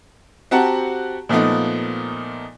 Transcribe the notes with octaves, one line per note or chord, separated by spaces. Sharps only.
C4 F#4 G4 F#5 A5 A#5
A#2 F3 A3 B3 D#4